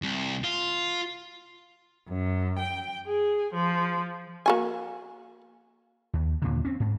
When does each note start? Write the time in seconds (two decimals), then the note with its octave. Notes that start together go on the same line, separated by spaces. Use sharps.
0.02 C2
0.44 F4
2.08 F#2
2.58 G5
3.06 G#4
3.55 F3
4.46 A#3 F#4 G#5
6.14 D#2
6.42 D#2 A#2 D3
6.65 C4 C#4
6.80 G#2